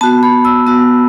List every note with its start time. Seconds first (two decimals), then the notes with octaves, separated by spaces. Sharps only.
0.01 B3 F#4 A5
0.23 B5
0.45 E6
0.67 B3 F#4 E6